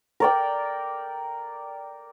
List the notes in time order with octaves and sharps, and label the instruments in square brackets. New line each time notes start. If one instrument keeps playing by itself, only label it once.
[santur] A#4 D5 G5